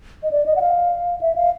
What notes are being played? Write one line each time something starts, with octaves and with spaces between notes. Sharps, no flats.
D#5
D5
D#5
F#5
F5
E5
F5